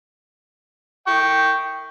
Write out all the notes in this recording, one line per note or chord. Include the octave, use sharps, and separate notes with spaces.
G5 C#6